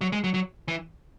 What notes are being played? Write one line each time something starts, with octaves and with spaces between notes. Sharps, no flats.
F#3
G#3
F#3
F#3
E3